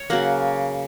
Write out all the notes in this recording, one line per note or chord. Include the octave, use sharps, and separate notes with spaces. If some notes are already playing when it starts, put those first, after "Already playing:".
Already playing: C#5
C#3 F#3 A#3 F#5